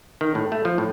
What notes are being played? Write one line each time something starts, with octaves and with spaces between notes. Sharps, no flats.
D#3
A2
A3
F3
A2